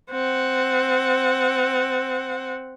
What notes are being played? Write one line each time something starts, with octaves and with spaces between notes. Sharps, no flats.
C4 F#5